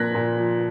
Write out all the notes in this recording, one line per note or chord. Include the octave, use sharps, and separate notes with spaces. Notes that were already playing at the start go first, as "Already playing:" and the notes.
Already playing: A#2 F3 A#3 F#6 G#6 A#6 B6
A#2
F3